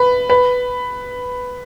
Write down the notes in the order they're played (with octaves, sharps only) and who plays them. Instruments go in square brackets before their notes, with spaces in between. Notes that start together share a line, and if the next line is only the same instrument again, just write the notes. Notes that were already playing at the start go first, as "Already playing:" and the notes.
Already playing: [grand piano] B4
B4